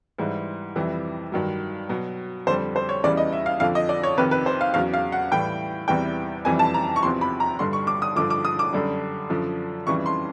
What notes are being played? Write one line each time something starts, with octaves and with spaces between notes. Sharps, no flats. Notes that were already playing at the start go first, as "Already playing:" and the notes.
G#2 E3 G3
F2 C3 E3 G3
G2 D#3 F#3
B2 F#3
F2 D3 G3 C5
C5
C#5
E2 C#3 E3 G3 D5
D#5
E5
F5
F2 D3 F3 F5
D#5
D5
C#5
F2 C3 D#3 B4
B4
C5
F5
E2 C#3 F#3 F5
F5
F#5
A2 E3 G3 G5
E2 C3 E3 G3 G5
F2 C3 E3 G3 G#5
A5
A#5
C#6
E2 C3 F3 C6
B5
A#5
G2 D3 G3 C6
C#6
D6
D#6
G2 D3 F3 D6
D6
D#6
D6
F#2 D3 G3
F#2 D3 F3
F2 C#3 E3 G3 C#6
C6